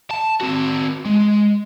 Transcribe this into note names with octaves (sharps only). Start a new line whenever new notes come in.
A5
C4 F#4
G#3